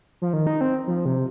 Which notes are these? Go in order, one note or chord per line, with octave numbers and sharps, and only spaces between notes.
F3
D#3
D#4
C4
F3
C3